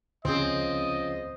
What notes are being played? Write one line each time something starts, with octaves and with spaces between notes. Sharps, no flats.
C#2 F3 C4 C#4 G#4 D#5